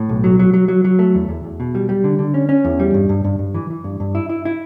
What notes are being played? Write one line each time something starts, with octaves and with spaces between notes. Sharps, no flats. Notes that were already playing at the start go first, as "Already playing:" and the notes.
Already playing: A2
B1
F#3
F#3
F#3
F#3
F#3
A3
E2
E2
E2
B2
G3
G3
D3
D3
C#4
C#4
E2
G3
G2
G2
G2
G2
E3
E3
G2
G2
E4
E4
E4